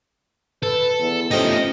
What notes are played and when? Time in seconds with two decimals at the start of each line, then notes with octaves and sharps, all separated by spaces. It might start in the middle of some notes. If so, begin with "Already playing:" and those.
0.63 A4 B4
0.99 E2
1.31 F3 A3 C#4 D#4 G4 D#5